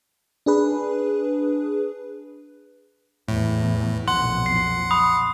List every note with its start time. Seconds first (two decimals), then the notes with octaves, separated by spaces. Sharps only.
0.46 D4 G#4 B4
3.28 E2 A2 E3
4.08 B1 F2 A#2 F#5 C6
4.46 C7
4.91 B5 D#6